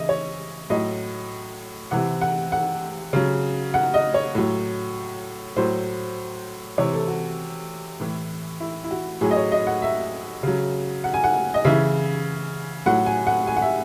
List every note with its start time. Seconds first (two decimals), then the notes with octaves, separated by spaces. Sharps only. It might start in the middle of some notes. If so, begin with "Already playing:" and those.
Already playing: C#3 E3 D#5 E5
0.09 C#5
0.70 A2 F#3 D#5
1.91 C3 E3 F#5
2.21 F#5
2.52 F#5
3.13 C#3 F#3
3.74 F#5
3.94 D#5
4.14 C#5
4.35 A2 F#3
5.56 A2 F#3 C5
6.78 C3 E3 C#5
6.93 A4
7.08 F#4
8.00 A2 E3
8.60 E4
8.84 E4
8.91 F#4
9.21 A2 F#3 G#4
9.31 D#5
9.36 C#5
9.52 D#5
9.67 F#5
9.82 E5
10.43 C#3 F#3
11.04 F#5
11.14 G#5
11.24 F#5
11.54 D#5
11.64 C#3 E3 E5
12.86 A2 F#3 F#5
13.06 G#5
13.27 F#5
13.47 G#5
13.56 F#5
13.62 E5